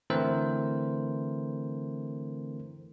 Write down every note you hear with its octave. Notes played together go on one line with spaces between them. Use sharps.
D3 E3 A3 C4 A#4 C5